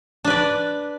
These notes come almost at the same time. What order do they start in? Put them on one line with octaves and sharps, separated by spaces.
D4 B4 D5